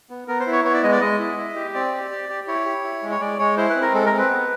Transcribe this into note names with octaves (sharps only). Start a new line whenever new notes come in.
B3
B3 A#4
C5
E4
C#5
B3 C#5
D5
G#3 D#5
D5
G#3 D#5
E4
E4
G4
C4 D5
G4
G4
G4
E4 C#5
G4
E4
G#3
C#5
G#3 D5
G#3 C#5
E4 C5
B4
C4
A#4
G#3 A4
A#4
C4
B4
B3